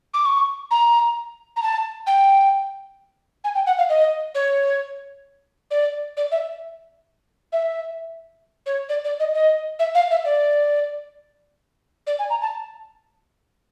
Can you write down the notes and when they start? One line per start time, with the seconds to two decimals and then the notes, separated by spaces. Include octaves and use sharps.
0.14 D6
0.25 C#6
0.71 A#5
1.56 A#5
1.63 A5
2.07 G5
3.44 G#5
3.55 G5
3.67 F#5
3.78 F5
3.89 D#5
4.35 C#5
5.71 D5
6.17 D5
6.32 E5
7.53 E5
8.66 C#5
8.89 D5
9.05 D5
9.20 D#5
9.34 D#5
9.79 E5
9.95 F5
10.11 E5
10.25 D5
12.07 D5
12.19 G#5
12.30 A#5
12.42 A5